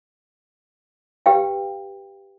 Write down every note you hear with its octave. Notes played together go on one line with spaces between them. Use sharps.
G4 B4 F5 G5